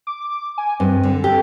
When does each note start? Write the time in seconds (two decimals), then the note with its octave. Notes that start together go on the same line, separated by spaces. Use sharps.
0.07 D6
0.58 G#5
0.80 G2 C4
1.03 D3
1.24 G4 A4